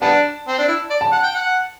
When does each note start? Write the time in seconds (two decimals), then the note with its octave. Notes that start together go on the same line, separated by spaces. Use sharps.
0.02 G3 B3 D4 A5
0.49 C4
0.58 D4
0.68 E4
0.90 D5
1.01 A5
1.13 F#5
1.24 G5
1.35 F#5